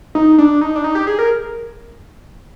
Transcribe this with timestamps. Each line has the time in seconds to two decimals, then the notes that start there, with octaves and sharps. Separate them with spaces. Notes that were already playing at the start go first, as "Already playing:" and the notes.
0.15 D#4
0.38 D4
0.61 D#4
0.76 D4
0.84 D#4
0.95 G4
1.07 G#4
1.19 A#4